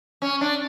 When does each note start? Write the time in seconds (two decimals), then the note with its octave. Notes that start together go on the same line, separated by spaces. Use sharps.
0.22 C#4
0.41 D4